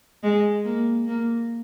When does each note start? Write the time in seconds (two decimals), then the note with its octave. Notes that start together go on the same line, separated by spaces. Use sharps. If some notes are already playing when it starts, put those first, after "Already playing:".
0.23 G#3
0.65 A#3
1.07 A#3